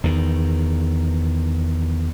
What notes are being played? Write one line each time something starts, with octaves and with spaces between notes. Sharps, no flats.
E2 D#3